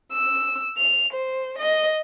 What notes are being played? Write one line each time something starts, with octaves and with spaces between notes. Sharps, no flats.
E6
F7
C5
D#5